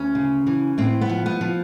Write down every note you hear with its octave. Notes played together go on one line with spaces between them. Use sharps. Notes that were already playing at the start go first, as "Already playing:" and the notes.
Already playing: D2 C#4
C#3
E3
A2 C4
B3
F3
B3
F3